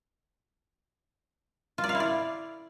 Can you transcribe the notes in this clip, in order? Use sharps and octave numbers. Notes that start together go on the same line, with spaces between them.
F4
D5
F5
E4
D5